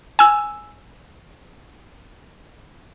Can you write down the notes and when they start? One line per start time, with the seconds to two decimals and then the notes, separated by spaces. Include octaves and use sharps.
0.19 G#5 E6